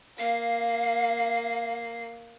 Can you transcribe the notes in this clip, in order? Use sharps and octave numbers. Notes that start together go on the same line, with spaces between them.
A#3 F5 C7